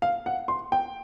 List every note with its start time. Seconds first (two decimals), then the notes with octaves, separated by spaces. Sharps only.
0.02 F5
0.26 F#5
0.48 C6
0.72 G5